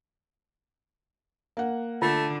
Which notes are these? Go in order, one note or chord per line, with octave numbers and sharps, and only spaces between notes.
A#3 F#5
D3 A3 F4